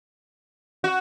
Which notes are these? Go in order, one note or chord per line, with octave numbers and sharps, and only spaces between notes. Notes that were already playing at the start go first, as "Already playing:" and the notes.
F#4